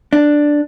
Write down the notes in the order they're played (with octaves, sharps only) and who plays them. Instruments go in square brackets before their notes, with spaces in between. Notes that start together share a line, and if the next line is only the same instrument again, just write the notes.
[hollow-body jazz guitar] D4